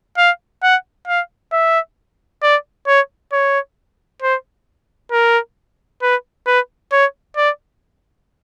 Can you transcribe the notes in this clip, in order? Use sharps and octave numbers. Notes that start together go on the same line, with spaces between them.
F5
F#5
F5
E5
D5
C#5
C#5
C5
A#4
B4
B4
C#5
D5